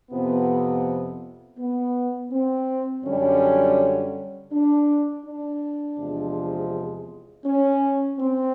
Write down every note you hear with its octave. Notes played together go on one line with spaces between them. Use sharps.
F2 C3 F3 B3
B3
C4
F#2 D3 G3 C#4
D4
D4
E2 C3 F3 G#3
C#4
C4